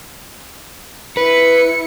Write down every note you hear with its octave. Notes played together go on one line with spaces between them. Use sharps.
E4 B4 C#7